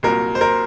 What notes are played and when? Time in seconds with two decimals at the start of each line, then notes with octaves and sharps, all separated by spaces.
0.03 C2 A#2 F#3 A#4
0.35 C5
0.41 A#4